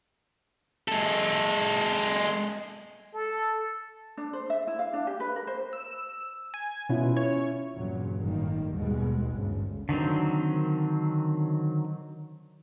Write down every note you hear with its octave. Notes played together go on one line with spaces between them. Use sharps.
G#3 A4
A4
D4
C5
E5
E4
F5
D4
G4
B4
A#4
C5
E6
G#5
B2 C#4 E4 F4
C#5
E2 G2 A#2 C#3 F#3
G1 F#2 A2 D#3 G3 A#3
D#2 G#2 B2 G3 G#3
G#1 D2 G2 C#3
D3 D#3 F#3 C4